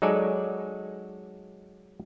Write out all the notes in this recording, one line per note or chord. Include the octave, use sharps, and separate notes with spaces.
F#3 G#3 D#4 A4 D5 G#5